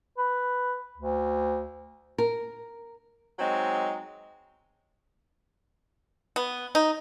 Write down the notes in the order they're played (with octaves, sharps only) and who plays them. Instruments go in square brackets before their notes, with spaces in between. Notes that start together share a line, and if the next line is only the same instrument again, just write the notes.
[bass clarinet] B4
D2
[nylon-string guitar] A#4
[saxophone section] F#3 G#3 C4 D#4
[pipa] B3
D#4